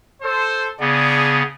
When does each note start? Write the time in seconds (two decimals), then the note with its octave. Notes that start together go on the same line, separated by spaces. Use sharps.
0.22 A4 C5
0.80 C#3 B3 D4 G#4 D5